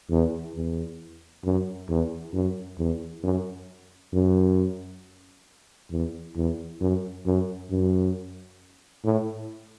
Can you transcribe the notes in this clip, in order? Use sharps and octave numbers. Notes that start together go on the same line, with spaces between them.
E2
E2
F#2
E2
F#2
E2
F#2
F#2
E2
E2
F#2
F#2
F#2
A2